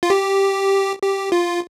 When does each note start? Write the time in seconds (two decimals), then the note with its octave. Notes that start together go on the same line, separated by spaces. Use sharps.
0.03 F4
0.10 G4
1.02 G4
1.32 F4